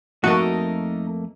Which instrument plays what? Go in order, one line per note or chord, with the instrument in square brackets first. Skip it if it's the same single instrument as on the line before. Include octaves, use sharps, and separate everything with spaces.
[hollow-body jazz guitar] F2 [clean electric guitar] A3 A#3 D#5 [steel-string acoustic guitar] D#4 A4 A#4 [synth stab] F#4